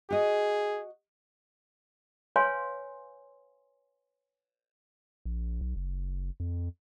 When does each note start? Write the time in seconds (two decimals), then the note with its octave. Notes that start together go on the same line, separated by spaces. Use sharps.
0.10 F#4 G#4 D#5
2.36 B4 C#5 F5 G#5 C6
5.25 A#1
5.61 B1
5.76 F#1
6.40 F2